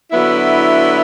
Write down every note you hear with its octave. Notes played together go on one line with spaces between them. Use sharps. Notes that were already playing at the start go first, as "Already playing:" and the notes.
D3 F#3 B3 E4